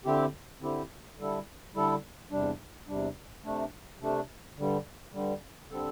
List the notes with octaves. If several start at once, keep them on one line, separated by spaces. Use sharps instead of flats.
D3 C4 E4 G4
D3 C4 E4 G4
D3 G3 E4 A4
D3 G3 E4 A4
E2 C3 G3 D4
E2 C3 G3 D4
C3 A3 D4
C3 A3 D4
G2 D3 G3
G2 D3 G3
D3 G3 C4 A4